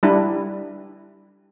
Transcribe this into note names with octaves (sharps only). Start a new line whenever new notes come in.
G3 D4 E4